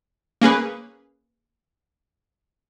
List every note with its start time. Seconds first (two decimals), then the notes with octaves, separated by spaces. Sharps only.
0.41 A#3 C#4 G#4 B4